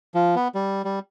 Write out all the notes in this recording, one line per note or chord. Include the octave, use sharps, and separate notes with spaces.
F3
B3
G3
G3